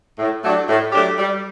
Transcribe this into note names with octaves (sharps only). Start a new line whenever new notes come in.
A2
F#3 A3 D4 G4
A2
F#3 A3 D4 G4
G3